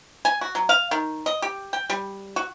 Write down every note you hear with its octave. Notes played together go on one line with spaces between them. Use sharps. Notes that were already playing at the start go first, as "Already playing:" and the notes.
G#5
F#4
F#3
F5
D#3
D#5
G4
G5
G3
F#4